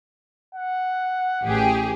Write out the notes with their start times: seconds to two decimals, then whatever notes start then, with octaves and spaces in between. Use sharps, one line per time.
0.55 F#5
1.43 A1 G4 G#4